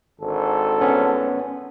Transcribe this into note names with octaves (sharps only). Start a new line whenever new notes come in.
G#1 D3 A4
B3 C#4